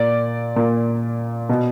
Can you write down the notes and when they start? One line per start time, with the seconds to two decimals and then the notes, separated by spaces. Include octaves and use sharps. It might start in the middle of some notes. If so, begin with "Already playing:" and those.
Already playing: A#2 D5
0.56 A#2
1.49 B2